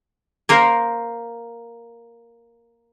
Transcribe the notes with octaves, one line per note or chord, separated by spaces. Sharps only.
A#3 A#4 C5